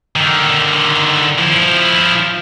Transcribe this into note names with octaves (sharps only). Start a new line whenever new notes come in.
D3 D#3
F3 E4